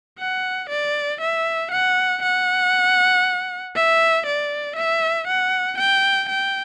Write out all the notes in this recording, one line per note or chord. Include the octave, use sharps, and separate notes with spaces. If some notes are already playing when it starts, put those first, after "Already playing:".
F#5
D5
E5
F#5
F#5
E5
D5
E5
F#5
G5
G5